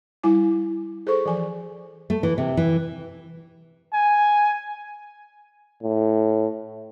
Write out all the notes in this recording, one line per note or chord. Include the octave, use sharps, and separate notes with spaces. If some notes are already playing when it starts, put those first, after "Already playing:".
G3 E4 G#5 D6
G#4 A4 C5 C#6
E3 F3 G#5
A3
E3
C3
E3
G#5
A2